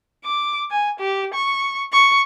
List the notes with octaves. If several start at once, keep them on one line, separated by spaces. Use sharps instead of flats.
D6
G#5
G4
C#6
C#6